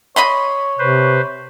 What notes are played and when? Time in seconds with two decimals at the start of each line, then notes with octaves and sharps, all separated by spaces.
0.16 C#5 D#5 B5 C6
0.79 C3 B4 C5